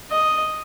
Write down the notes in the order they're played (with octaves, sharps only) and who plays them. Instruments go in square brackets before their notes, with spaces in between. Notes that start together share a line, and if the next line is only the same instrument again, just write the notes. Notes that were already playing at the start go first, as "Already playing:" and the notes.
[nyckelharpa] D#5